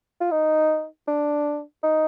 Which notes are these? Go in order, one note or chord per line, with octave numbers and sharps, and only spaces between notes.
F4
D#4
D4
D#4